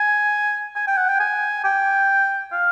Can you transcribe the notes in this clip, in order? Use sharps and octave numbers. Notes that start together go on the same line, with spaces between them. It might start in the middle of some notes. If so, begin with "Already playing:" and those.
Already playing: G#5
G#5
G5
F#5
G5
G#5
G5
F5